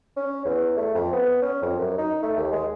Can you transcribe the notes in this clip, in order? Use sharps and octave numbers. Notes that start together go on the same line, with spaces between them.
C#4
E2
A3
F2
B3
C#4
F2
F#2
D#4
A3
D#2
G#3